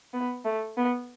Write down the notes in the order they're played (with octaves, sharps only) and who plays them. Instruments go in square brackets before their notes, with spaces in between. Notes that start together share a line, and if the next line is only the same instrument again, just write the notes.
[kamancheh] B3
A3
B3